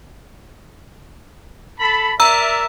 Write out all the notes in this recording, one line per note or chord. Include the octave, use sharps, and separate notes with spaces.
A4 A5 B5
A#4 D5 E5 A#5 E6